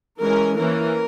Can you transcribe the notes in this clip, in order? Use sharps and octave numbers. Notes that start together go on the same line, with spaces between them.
E3 G#3 C#4 A#4
E3 A#3 C#4 A#4